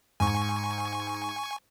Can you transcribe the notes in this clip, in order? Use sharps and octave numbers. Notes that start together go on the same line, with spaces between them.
G#2 G#5 C#6